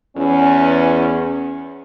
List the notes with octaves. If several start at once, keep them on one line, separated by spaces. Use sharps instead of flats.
E2 C#4